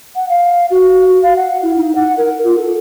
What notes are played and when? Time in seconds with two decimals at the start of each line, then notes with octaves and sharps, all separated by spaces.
0.15 F#5
0.29 F5
0.70 F#4
1.23 F5
1.36 F#5
1.63 E4
1.77 D#4
1.95 F#5
2.17 A#4
2.44 F4
2.58 A4